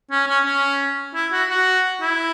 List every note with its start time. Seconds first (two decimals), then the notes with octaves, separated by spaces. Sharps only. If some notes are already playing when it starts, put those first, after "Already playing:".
0.11 C#4
0.28 C#4
0.45 C#4
1.15 E4
1.32 F#4
1.49 F#4
2.01 E4